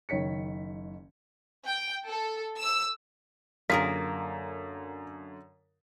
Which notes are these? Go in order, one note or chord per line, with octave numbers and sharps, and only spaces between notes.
F#1 D#3 C#5 B6 C#7
G5
A4
E6
F#2 D3 A#3 F4 G#4 A#4 B6